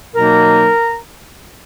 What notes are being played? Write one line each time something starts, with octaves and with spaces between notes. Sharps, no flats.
B2 F#3 A#3 D#4 A#4 A#5